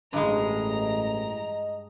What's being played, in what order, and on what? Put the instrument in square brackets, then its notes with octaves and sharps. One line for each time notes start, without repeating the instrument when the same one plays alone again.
[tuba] A1 [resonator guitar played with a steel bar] G2 G#3 [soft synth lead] D#5 [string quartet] A#5